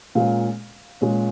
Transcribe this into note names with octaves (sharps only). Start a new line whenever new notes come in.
A#2 G#3 C#4 F5
A#2 G#3 C#4